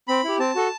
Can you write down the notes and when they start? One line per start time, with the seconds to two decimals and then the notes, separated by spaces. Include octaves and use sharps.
0.08 C4 B5
0.24 E4 G4
0.39 C4 A5
0.55 F#4 A4